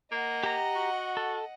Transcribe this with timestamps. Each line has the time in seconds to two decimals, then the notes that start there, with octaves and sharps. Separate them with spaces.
0.12 A#3 D#5 F#5
0.43 G4 A#5
0.75 F#4
1.17 A4